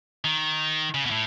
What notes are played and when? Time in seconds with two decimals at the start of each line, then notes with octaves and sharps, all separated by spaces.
0.25 D#3
0.94 C#3
1.05 B2
1.11 A2